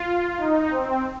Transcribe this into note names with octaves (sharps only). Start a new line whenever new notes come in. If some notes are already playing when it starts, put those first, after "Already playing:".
Already playing: F4
D#4
C4